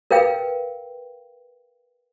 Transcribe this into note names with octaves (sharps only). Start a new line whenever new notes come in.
A#4 B4 F5 G5